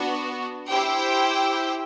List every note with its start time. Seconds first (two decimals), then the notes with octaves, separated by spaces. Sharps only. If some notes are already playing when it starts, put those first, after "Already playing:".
Already playing: B3 D4 F#4
0.70 E4 G4 C5 G5